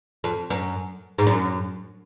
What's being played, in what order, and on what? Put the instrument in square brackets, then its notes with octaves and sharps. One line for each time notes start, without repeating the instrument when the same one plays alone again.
[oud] F2
F#2
G#2
F#2